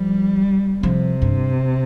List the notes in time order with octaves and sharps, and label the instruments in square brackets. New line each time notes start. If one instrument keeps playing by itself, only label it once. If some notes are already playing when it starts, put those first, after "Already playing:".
Already playing: [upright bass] F3 [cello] G3
[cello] C3 [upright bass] F3
[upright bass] G2